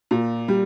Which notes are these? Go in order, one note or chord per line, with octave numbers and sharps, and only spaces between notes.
A#2
G3